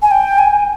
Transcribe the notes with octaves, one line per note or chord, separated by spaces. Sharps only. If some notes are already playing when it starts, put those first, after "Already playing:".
G#5
G5
G#5